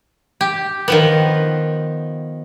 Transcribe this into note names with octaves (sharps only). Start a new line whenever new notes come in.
G4
D#3 F3 B3